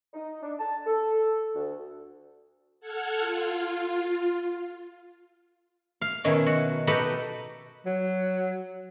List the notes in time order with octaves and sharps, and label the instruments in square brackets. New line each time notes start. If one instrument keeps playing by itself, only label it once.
[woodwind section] D#4
D4
A5
A4
D2
[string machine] A4 F#5 F6 G#6
F4
[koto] F5
B2 D#3 C#4 E4
F#4
D#4 F#4 G4 A4 B4
[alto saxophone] F#3